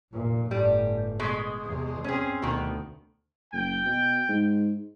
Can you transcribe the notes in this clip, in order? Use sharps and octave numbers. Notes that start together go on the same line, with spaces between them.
F1 A#2
G1 A2 G3
B2 G#3
E2 C3
C4 C#4 G#4
D2 B2 D#3
F#1 G5
B2
G#2